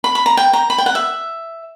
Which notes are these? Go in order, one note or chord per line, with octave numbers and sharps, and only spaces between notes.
B5
B5
A#5
G5
A#5
B5
G5
F#5
E5